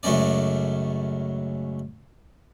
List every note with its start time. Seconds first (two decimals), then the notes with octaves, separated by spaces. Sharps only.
0.03 C#2 F#2 A3 C#4 D5